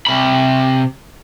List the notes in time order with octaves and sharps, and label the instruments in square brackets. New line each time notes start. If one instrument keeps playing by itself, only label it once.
[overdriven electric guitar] C3 B5